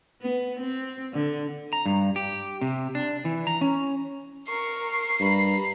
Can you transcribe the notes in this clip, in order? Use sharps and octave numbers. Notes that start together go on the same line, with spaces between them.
B3
C4
D3
A#5
G2
G4
C3
D4
E3
A#5
C#4
A#4 C#6 C7
G2 A#5 B5